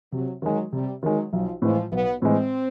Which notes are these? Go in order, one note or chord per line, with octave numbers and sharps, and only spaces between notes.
C3 F#3
D#3 F#3 G#3
C3 G3
D#3 F#3 G#3
B1 F3
A2 E3 F3 G#3
B1 B3
A2 E3 G#3 C4